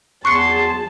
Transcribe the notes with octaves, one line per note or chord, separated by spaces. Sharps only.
E2 G#4 A5 C6 C#6 F#6 C#7